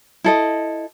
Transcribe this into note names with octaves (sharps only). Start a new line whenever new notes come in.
E4 A4 D#5